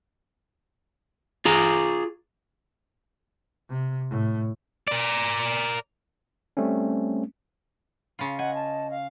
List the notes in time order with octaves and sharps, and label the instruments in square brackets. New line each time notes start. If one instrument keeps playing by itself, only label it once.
[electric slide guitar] F4 G#4 A#5
[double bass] C3
A2
[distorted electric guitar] A#4 D5
[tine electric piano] G3 A3 C4 C#4
[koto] C#3 F4
[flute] D#5 [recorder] F#5 [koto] G#5
[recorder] A5
F5